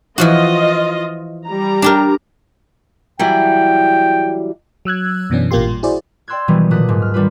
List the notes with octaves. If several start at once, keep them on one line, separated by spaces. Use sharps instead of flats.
E3 F3 F4 F#4 D#5
G3 A#5
D4 G4 A#4
E3 F#3 G3 G5
F#3 E6 F#6 G#6
F#2 B2 E3 B3 C#4 D4
A1 A#2 A#3 F4 G4 C6
G3
E4 F#4 G#4 C5 D5
D5 G5 C6 E6 F#6 G#6
B2 D#3 E3 F#3 G3 B3
A#2 D3 D#6 F#6 B6
D#2 G#2
F6
D#3 G3 D4 F4 B4